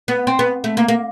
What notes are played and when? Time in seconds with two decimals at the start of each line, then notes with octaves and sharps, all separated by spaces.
0.08 B3
0.27 C4
0.39 B3
0.64 A3
0.77 A#3
0.88 A#3